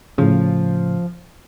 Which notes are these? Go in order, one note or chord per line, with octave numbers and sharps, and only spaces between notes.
A2 C#3 F3